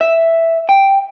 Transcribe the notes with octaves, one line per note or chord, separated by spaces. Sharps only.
E5
G5